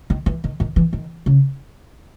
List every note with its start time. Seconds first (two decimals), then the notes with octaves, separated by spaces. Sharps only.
0.10 D#3
0.26 E3
0.44 D#3
0.60 D#3
0.76 E3
0.93 D#3
1.26 C#3